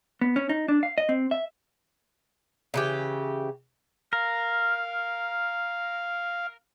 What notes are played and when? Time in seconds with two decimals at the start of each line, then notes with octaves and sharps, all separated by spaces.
0.21 B3
0.36 C#4
0.49 D#4
0.68 D4
0.83 F5
0.98 D#5
1.09 C4
1.31 E5
2.74 C#3 E3 G4
4.13 A#4 F5